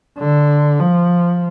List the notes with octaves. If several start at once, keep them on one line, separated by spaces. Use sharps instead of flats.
D3
F3